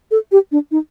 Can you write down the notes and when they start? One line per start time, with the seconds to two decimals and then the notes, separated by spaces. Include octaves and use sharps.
0.11 A4
0.32 G4
0.52 D4
0.71 D#4